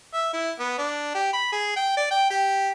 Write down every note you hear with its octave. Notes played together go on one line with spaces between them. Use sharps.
E5
E4
B3
D4
G4
B5
G#4
G5
D5
G5
G4